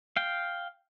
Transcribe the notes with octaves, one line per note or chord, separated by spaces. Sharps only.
F5 G5